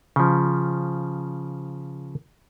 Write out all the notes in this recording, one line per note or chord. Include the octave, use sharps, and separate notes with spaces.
C#3 F3